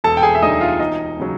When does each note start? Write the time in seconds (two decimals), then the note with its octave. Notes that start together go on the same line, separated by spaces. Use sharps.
0.04 E1 A4 A5
0.17 G5
0.22 G#4 G#5
0.35 E5
0.42 D2 D3 G3 D#4 D#5
0.61 F4 F5
0.79 E1 D#4 D#5
1.20 C#3 F#3